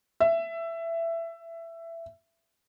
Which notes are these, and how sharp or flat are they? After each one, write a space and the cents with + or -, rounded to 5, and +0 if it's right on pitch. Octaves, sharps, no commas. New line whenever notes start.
E5 +15